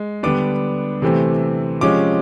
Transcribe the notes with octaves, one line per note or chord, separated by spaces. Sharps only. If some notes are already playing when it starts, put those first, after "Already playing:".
Already playing: G#3
D3 G3 B3 D4 D6
C3 E3 A3 C4
C3 F3 G#3 C#4 D6